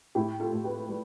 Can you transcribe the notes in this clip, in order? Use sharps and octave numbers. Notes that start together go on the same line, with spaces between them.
A2 E4 G4
F4 A4
A2
G4 B4
G3